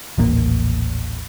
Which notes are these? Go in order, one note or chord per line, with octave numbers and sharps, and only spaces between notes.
D#1 A1 A#3